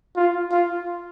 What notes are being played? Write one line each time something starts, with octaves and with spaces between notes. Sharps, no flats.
F4
F4